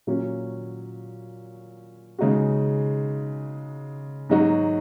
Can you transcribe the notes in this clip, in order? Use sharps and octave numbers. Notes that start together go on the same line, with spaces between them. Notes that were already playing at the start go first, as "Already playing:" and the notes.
A#2 F#3 C#4 F#4
C#3 G#3 D#4 F#4
G#2 F#3 D#4 F#4